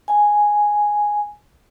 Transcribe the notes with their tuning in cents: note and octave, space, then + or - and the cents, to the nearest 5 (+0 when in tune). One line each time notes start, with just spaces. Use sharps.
G#5 +0